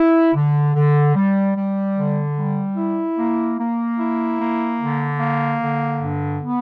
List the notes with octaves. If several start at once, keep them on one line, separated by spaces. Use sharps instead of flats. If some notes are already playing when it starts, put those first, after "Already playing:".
Already playing: E4
D3
D3
G3
G3
D3
G3
E4
A#3
A#3
E4
A#3
D3
A#3
D3
G2
B3